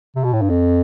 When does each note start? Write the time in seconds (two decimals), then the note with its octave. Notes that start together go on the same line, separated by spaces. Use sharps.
0.16 C3
0.24 B2
0.33 A2
0.42 G2
0.50 F2